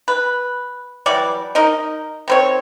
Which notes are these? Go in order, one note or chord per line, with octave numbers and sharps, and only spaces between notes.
B4
E3 F#3 G3 D5
D#4 A#4 D#5
D#3 C4 C#5